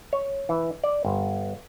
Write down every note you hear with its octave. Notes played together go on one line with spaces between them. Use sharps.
C#5
E3
D5
G1